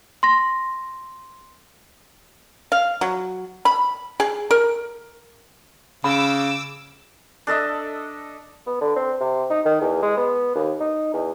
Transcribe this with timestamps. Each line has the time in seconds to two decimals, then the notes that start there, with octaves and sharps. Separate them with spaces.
0.23 C6 A#6
2.72 F5
3.01 F#3
3.65 B5
4.20 G#4
4.51 A#4
6.04 C#3 B5 D6 E6
7.47 D4 A4 D#5 E5
8.67 B3
8.81 D3
8.96 C4
9.21 C3
9.50 D#4
9.65 D#3
9.81 E2
10.02 G#3
10.17 B3
10.55 D#2
10.80 D#4
11.14 E2